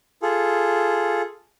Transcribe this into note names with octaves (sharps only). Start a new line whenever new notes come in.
F4 G#4 A4